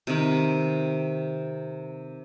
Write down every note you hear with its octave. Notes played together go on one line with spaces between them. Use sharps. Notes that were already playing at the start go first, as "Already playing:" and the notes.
C3 D#3